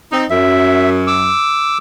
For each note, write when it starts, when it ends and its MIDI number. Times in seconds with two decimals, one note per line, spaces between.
0.12 0.25 60
0.12 0.25 63
0.30 1.32 42
0.30 0.90 76
1.07 1.78 86
1.07 1.78 88